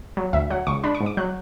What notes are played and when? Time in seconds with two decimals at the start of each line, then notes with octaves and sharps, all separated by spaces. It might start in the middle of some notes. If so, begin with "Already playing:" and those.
0.17 F#3
0.33 D2 E5
0.50 F#3 F#5
0.67 C#2 C#6
0.84 D4 B5
0.95 C#6
1.00 G#2
1.06 D6
1.17 F#3 F#6